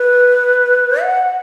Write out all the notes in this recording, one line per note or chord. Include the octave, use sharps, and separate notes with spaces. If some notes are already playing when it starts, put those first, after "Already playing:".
Already playing: B4
F#5